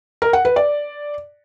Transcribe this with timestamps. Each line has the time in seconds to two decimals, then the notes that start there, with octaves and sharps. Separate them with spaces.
0.22 A#4
0.33 F#5
0.45 B4
0.56 D5